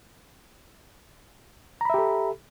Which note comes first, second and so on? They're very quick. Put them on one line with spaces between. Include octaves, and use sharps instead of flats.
A#5 B5 E5 G4 A4